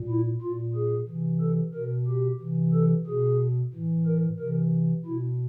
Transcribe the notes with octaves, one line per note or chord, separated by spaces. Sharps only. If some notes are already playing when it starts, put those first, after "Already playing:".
Already playing: A#2
E4
A#2 F4
G#4
C3 E3
A4
B2 A#4
G4
C3 E3
A4
B2 G#4
A2 E3
A#4
C3 E3 A#4
B2 E4